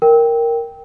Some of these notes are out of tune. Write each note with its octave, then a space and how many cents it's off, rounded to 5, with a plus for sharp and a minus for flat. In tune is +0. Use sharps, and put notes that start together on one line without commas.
A#4 +0 G5 +0